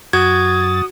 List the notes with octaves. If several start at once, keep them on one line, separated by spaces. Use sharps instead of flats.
F#2 F#4 D#6 G#6 A6